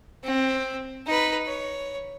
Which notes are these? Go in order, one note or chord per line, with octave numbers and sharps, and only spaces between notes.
C4
D#4 B4
C#5